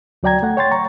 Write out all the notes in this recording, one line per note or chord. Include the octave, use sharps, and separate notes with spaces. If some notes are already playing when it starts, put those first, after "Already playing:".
D2 F#3 D5 G5 A#5 G#6
A3 F#5
C#5 G5 C6 A6
A#5 C#6